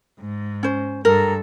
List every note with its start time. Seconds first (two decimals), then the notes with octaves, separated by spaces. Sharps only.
0.20 G#2
0.63 C#4 C5
1.05 G2 A4 A#4